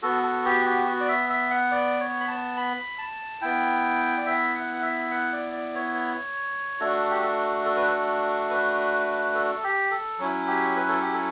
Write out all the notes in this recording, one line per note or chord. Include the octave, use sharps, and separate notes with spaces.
B3 F#4 A4
A4
G4
G4
F#4
D5
E5
E5
F#5
D5
C#5
B5
A5
B5
A5
B3 E4 G5
D5
E5
F#5
F#5
E5
F#5
D5
D5
C#5
A3 D4 F#4 A4
G4
A4
A4
B4
A4
B4
A4
G4
A4
F#3 C#4 E4
G4
B4
A4
G4
A4